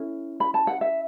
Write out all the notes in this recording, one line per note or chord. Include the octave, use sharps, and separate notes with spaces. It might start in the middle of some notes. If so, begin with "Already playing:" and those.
Already playing: C#4 E4 A4
B5
A5
F#5
E5